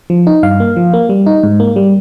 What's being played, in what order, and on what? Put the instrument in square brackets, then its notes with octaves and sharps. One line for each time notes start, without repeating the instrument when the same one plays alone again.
[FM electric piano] F3
D#4
G2 F5
A#3
F3
A#3
G3
D#4
G#2
A#3
G3